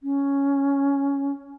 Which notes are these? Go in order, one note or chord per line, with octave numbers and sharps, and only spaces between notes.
C#4